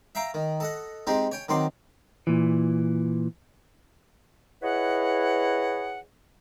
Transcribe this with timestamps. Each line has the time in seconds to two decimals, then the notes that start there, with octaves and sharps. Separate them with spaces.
0.15 E5 F5 G5 A#5
0.34 D#3
0.60 A4 D#5 F#5
1.07 G#3 C4 D#4 G4
1.31 C#5 G5 G#5
1.49 D#3 F#3 C4 C6 D6
2.27 A#2 E3
4.62 E4 G#4 B4 C#5 D#5 F#5